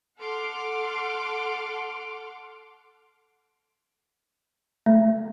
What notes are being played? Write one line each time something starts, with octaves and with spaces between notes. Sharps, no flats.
A4 F#5 C6 D6 F6 D7
A3